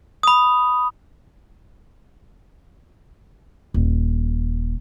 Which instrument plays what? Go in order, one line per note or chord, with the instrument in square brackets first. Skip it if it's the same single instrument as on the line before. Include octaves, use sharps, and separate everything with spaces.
[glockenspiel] B5 D#6
[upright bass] D#1